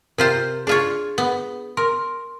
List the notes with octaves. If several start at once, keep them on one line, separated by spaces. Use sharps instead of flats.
C3 F4 A#4 C5
D4 F4 G#4 C#5
B3
A#4 C6